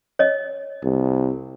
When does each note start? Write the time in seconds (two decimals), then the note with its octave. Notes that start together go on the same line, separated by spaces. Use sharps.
0.19 C#5 D#5
0.84 C2